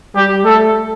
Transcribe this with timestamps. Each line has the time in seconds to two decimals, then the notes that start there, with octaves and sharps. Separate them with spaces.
0.15 G3 G4
0.46 A3 A4